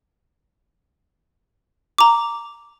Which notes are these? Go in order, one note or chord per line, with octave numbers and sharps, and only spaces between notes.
A#5 D6